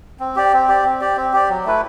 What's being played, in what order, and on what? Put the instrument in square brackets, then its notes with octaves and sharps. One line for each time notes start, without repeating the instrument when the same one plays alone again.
[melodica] C4
G4 D5
C4
G4 D5
C4
G4 D5
C4
G4 D5
F#3
A3 E4 B4